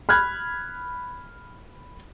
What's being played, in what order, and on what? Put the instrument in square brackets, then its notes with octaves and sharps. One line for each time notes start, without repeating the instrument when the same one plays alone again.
[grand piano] B5 F6 F#6 G#6